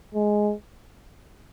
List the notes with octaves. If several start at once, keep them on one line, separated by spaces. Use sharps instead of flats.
G#3